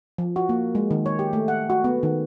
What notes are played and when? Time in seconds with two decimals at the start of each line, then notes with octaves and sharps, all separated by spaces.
0.18 F3
0.36 F#4
0.49 A#3
0.75 G#3
0.91 D#3
1.06 C#5
1.19 G4
1.33 A3
1.48 F#5
1.70 F#4
1.84 B3
2.03 D#3